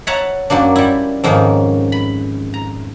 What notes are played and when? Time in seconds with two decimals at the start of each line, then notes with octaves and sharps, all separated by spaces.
0.07 C#5 E5 F#5 A5 A#5
0.50 F#2 F#3 A#3 D4
0.76 G3 E4
1.24 F2 G#2 D#3 A#3 C#4
1.92 B5
2.54 A#5